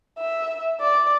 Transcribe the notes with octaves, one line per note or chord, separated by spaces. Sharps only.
E5
D5